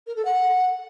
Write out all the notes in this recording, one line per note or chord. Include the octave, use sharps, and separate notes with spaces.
A#4
A4
F#5